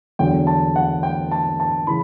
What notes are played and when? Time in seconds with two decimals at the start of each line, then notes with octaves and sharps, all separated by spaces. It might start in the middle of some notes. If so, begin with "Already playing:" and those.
0.19 E2 D3 F#3 G5
0.47 A5
0.76 F#5
1.03 G5
1.31 A5
1.60 A5
1.87 C#3 E3 B5